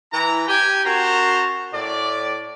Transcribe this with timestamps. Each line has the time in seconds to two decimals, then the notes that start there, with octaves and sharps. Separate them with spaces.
0.13 E3 E4 B4 A#5
0.48 G4 G5 G#5
0.85 C#4 F#4 A#4 C5 A5 A#5
1.73 A2 D5